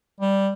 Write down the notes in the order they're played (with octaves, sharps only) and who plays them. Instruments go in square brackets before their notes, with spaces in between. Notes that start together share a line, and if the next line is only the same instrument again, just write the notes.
[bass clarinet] G3